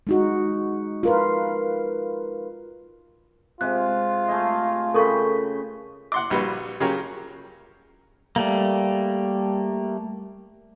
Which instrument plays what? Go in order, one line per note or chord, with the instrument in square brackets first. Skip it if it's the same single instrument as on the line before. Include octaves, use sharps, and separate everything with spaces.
[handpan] G#3 D#4 F#4
F4 A#4 B4
[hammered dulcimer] C3 G#3 [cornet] F4 [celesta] F#6
[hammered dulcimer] A3 G#4 D#5
[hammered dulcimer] C#3 G5 B5 [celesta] A4 A#4 C#6
[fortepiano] F#5 C6 D6
A#1 G3 F#4 B4
C#3 F#3 F4 G4 A#4 C#5
[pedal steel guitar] G3 A3 A#3